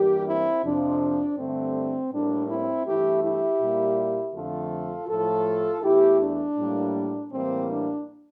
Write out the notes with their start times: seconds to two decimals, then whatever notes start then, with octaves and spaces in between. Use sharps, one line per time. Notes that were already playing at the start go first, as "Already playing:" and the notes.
Already playing: G2 E3 G3 A#3 G4
0.26 C4 E4
0.64 F2 C3 F3 D4
1.37 G2 D3 A3 C4
2.12 A2 G3 A#3 D4
2.49 C4 E4
2.86 G2 E3 A3 E4 G4
3.23 E4 G4
3.60 A#2 G3 A#3
4.34 F2 D3 F3 A3 F4 A4
5.08 A2 F3 A3 F4 A4
5.82 E2 E3 A3 E4 G4
6.21 D4
6.57 A2 G3 A#3
7.31 A2 E3 G3 A#3 C4
7.69 D4